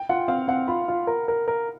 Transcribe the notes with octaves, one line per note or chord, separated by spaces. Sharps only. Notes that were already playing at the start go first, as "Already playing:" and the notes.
Already playing: G5
F4 F#5
C4 F5
C4 F#5
F4 B5
F4
A#4
A#4
A#4